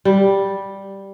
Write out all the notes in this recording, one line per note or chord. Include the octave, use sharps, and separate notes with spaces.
G3